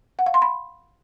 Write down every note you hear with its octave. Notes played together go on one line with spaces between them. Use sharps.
F#5
F5
C6
B5